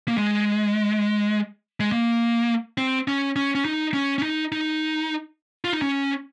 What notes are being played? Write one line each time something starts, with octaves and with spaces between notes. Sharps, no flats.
A#3
G#3
G#3
A#3
C4
C#4
C#4
C#4
D#4
C#4
C#4
D#4
D#4
F4
D#4
C#4